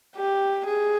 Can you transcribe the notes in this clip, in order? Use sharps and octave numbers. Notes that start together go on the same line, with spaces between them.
G4
G#4